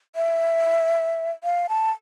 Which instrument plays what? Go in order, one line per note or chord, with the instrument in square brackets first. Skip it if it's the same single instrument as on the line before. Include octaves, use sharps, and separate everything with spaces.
[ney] E5
F5
A5